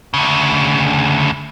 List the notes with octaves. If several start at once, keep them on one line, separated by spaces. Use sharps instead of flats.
D2 C#3